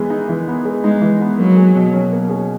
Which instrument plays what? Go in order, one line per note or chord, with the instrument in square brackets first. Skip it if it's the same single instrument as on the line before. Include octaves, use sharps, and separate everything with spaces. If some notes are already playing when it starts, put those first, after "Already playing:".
Already playing: [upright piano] E3 G#3 B3
D#4
E3
B3
G#3
[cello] G#3 [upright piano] D#4
[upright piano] E3
B3
[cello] F#3 [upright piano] A#3
[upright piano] G#4
B2
C#4
A#3
G#4